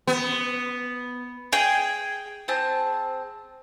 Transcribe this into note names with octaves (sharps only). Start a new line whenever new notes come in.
B3
G#4 G5
C4 G#4 A5